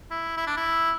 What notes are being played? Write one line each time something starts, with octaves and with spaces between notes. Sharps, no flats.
E4
E4
D4
E4